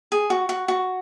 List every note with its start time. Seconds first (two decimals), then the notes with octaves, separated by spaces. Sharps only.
0.12 G#4
0.30 F#4
0.49 F#4
0.68 F#4